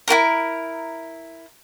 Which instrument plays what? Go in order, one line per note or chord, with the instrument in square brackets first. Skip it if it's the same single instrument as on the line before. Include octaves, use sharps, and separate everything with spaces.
[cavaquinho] E4 F#4 A#4 A#5